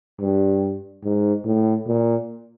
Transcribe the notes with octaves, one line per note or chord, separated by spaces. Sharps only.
G2
G#2
A2
A#2